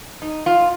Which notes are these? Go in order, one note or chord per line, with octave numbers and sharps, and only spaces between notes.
D#4
F4